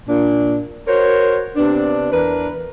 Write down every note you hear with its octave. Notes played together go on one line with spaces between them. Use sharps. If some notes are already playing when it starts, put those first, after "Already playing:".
A#2 D4
F#4 A#4 C5 C#5
C3 B3 D4
E2 D4 A#4 B4